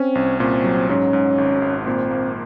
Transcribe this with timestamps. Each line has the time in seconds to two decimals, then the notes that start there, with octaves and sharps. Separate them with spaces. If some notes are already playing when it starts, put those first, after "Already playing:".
Already playing: C4 C#4
0.15 C2
0.40 A#2 C4
0.64 F#3
0.89 G#2 C#4
1.13 G#2
1.38 G#1
1.62 G#1
1.86 A#2 C4
2.11 A#3